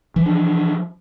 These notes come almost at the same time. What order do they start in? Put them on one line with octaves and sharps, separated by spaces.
E3 F3 D4